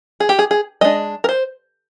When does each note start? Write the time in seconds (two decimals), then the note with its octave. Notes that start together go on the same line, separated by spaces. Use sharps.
0.20 G#4
0.29 G4
0.39 G#4
0.51 G#4
0.81 G#3 D4 D#5
1.24 A#4
1.29 C5